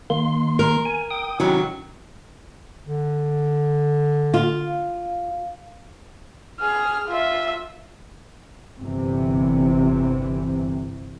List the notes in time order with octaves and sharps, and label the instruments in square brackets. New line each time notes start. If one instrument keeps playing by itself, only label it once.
[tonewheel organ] D#3 A#3 C6
[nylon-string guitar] A#4
[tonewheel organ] G#5
G5 D#6
[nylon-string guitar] C3 D#3 F#3 [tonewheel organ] C#4 E4
[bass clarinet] D3
[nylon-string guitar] F4 [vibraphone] F5
[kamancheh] G#4 F6
F4 E5
[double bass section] G1 C3 E3